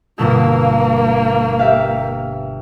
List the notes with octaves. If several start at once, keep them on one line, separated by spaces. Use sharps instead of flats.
G1 B2 A#3 E6
G4 E5 F5